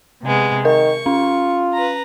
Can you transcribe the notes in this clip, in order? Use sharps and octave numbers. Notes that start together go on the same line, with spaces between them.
C3 G#3 B3
D#3 A#4 C#6
C#4 F4
B4 A#5